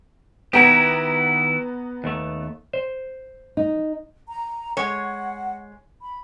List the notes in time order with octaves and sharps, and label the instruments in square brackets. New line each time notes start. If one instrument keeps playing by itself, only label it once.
[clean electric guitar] D#3 E4 G4 [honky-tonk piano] B3 A#5 G#6
[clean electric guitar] D#2 A3
[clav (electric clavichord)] C5
[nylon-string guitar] D#4
[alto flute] A#5
[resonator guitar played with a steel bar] G#3 C#5 [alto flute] F#5
[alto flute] B5